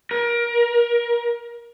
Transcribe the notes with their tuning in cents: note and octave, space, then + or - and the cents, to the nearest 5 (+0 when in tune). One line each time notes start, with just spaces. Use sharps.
A#4 +25